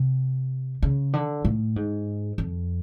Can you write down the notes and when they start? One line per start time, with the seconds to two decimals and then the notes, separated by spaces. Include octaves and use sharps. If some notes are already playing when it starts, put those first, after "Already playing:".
Already playing: C3
0.82 C#3
1.13 D3
1.45 A2
1.76 G#2
2.38 F2